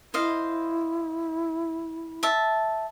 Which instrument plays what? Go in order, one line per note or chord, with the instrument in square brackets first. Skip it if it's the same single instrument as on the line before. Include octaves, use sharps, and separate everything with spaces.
[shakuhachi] E4 [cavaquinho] C5 D#5 F5
[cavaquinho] E5 A5